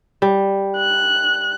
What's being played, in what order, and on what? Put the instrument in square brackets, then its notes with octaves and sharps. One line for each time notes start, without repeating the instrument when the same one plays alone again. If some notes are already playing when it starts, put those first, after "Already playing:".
[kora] G3
[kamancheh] F#6